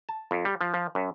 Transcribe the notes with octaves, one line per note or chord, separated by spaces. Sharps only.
A5
F2
G3
F3
F3
F#2